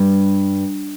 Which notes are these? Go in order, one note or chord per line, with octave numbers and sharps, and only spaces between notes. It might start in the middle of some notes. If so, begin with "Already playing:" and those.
Already playing: G2